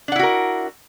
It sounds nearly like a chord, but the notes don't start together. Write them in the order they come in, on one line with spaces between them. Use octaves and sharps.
D4 F#5 E4 F#4 A#4